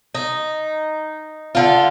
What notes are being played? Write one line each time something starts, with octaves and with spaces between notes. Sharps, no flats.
D#4
D3 F4